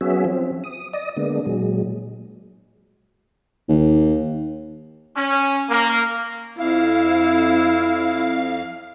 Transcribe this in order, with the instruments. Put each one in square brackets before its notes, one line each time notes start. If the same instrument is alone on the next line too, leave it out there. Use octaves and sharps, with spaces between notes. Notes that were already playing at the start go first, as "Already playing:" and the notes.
[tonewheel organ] F#3 B3 C#4 F#4 G#4 E5
F3 C4
D#6
D5 D#5 D#6
D3 G#3 A#3 B3 D4
A#2 F#3 G#3
[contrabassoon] D#2
[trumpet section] C#4
A#3
[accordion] F2 F5 [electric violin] E4